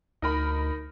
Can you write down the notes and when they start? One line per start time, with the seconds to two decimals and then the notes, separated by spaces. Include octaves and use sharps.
0.22 D2 D#4 A#4 B5